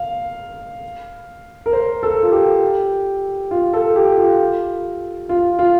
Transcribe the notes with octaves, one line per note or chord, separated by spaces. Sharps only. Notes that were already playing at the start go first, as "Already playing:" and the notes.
Already playing: F5
A#4
C5
A4
F4
G4
F4
A4
G4
F4
F4
F4